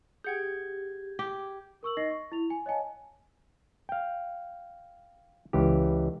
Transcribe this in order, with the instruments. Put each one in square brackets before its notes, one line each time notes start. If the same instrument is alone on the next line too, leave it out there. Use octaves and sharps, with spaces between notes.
[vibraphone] G4 [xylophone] G#4 F#5 G5 [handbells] G6 G#6
[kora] G4
[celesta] A#4 C#6 E6 F#7
D#4 D#5 A#6 C7
C#6
E4 F7
G#5
C#5 D#5 F5 G#5 A5
[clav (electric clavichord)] F5 G5
C#2 E3 G4